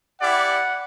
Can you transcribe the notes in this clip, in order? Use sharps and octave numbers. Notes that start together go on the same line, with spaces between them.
E4 G4 D5 F#5